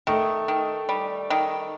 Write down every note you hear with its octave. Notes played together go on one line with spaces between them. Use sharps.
D#3 A3
D#3
G3
D#3